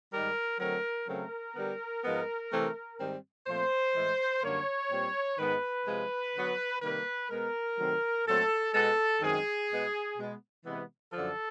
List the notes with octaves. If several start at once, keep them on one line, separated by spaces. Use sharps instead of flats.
G#2 D#3 G3 A#4
D3 F#3 A3 C4 A#4
C#3 F#3 A3 C4 A#4
D3 G3 B3
G#2 F3 G#3 B3
C3 E3 A3 C4
G#2 D#3 G3 C4
A#2 F3 A3 C4 C5
A2 E3 G#3
F#2 D3 G3 A#3 C#5
A#2 G3 C4
G#2 D#3 G#3 B3 B4
C3 F3 G#3
D3 F#3 B3
C3 D#3 G3 A#3 B4
B2 G#3 B3 A#4
C3 D#3 F#3 A3 C4
A#2 F#3 A3 C4 A4
B2 G#3 B3 A4
F#2 D#3 G#3 C4 G#4
B2 G#3 B3
B2 G#3 B3
C3 E3 G#3 B3
F#2 D3 F3 A4